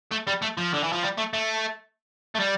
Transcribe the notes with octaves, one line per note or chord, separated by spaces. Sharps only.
A3
G3
A3
F3
D3
E3
F3
G3
A3
A3
A3
G3